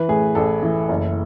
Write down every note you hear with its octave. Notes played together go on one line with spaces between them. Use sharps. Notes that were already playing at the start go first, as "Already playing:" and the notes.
Already playing: E3 B4
A2 G#4
A1 A4
E3
F#1